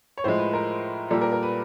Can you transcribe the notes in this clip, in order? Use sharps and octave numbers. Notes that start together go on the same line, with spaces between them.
C#5
A2 F3 G#3 C5
B4
A#4
A#2 G3 A#3 A4
A#4
A#4
B4